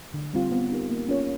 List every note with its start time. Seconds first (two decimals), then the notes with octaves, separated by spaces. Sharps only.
0.14 D3
0.33 G3 C4 F4
0.51 B3
0.71 D#4 G4 A#4
0.90 A#3
1.09 C#4 F4 A#4 C#5